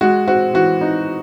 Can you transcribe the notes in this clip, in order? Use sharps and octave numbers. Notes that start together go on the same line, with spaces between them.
G#3 F#4
C4 F#4
E3 F#4
D#4